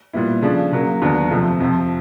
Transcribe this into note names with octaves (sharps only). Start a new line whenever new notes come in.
A#2 G3 B3 E4
C#3 F3 A3 D4
C#3 F#3 A#3
D#2 D3 F#3 B3 D4
F2 C3 F3 A3
F2 C3 F3